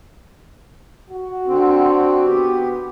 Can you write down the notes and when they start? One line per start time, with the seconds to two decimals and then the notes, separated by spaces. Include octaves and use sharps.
1.10 F#4
1.47 D3 C4
2.24 B3 G4